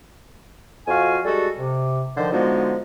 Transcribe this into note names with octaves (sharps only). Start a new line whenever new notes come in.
F2 F#4 F5 G#5
G3 G#3 F#4 A4
C3
D3 D#3 F3 C5
D3 F3 G#3 B3 D#4 F#4